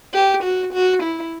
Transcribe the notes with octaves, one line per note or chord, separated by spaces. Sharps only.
G4
F#4
F#4
E4